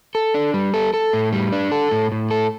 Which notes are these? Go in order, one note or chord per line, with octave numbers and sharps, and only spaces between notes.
A4
D4
G3
A4
A4
A2
G3
D4
A4
A2
A2
A4